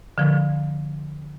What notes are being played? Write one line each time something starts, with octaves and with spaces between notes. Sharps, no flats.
D3 F3